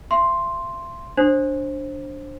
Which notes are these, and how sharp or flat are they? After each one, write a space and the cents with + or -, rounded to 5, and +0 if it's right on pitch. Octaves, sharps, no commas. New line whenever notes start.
E5 +45 C6 +0
D4 +0 C5 +20